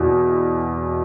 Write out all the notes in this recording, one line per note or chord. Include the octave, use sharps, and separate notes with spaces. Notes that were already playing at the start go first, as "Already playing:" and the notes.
Already playing: E2 B2